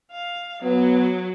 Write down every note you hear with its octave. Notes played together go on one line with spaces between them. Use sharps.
F5
F#3 B3